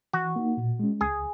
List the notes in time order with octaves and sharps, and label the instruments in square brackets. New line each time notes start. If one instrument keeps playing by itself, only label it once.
[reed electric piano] E3 [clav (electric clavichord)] F#4
[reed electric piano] A#3 D#4
A#2
G#3 C#4
[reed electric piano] C#2 [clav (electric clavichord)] G#4